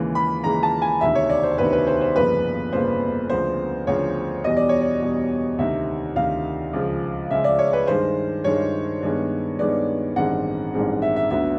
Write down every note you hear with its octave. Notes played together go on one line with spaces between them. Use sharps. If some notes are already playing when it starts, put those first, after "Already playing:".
Already playing: D#2 C#3 E3 G#3
B5
D#2 C#3 E3 G#3 A#5
A5
G#5
E1 D2 C3 D#3 E5
C#5
D5
C5
E1 D2 C3 D#3 B4
B4
C5
C5
G1 F2 C#3 F3 A#3 B4
G1 F2 C#3 F3 A#3 C5
D2 C#3 F3 C5
D2 C#3 F3 C#5
E2 B2 G3 D#5
D5
C#5
D5
E2 B2 G3
D2 C3 D#3 E5
D2 C3 D#3 F5
C#2 C#3 F3 G#3
C#2 C#3 F3 G#3 E5
D5
C#5
B4
G2 D#3 G#3 C5
G2 D#3 G#3 C#5
G2 D#3 G#3 B3
G2 D#3 G#3 B3 D5
A1 G2 D#3 G#3 C4 F#5
A1 G2 D#3 G#3 C4
E5
E5
D2 D3 F#3 B3 E5